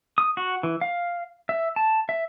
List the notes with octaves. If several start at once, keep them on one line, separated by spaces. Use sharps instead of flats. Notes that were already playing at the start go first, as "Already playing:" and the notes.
D#6
F#4
E3
F5
E5
A5
E5